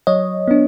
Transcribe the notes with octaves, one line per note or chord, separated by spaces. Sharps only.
F#3 C#5 D#5
B3 D4